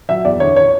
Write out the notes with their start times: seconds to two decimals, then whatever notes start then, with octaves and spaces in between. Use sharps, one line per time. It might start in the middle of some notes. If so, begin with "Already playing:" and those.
0.09 F#3 E5
0.25 E2 D5
0.40 D3 C#5
0.56 C#5